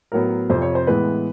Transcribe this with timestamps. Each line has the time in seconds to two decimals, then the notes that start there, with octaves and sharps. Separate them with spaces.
0.12 A2 F#3 B3 A#4
0.49 F2 C3 F3 C5
0.62 C#5
0.75 C5
0.87 A2 E3 G#3 B3 B4